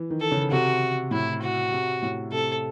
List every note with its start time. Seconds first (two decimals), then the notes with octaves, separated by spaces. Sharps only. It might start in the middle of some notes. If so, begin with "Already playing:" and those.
Already playing: E3
0.10 D#3
0.21 A4
0.32 C#3
0.51 C3 F#4
1.11 A2 E4
1.42 F#4
1.72 C3
2.02 A2
2.32 C3 A4